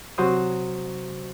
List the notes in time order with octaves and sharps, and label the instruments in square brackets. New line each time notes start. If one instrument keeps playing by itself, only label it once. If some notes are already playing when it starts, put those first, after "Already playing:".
[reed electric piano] C3 F#3 F#4 C5 D#6